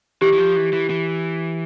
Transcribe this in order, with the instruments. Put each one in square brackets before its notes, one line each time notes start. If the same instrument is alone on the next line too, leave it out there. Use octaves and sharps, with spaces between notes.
[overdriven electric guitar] E3 [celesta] G4
[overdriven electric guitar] E3
F3
E3
E3
E3